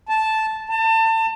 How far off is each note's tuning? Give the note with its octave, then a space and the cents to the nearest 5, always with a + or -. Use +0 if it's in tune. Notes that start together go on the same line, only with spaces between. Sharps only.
A5 -5
A5 +30